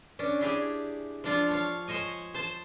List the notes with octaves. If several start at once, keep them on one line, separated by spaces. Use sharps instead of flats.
C#4 D4
D4 E4 G4 G#4
F3 D4 F4
C#5 F5
C5 C#5 D#5 G#5
C5 A5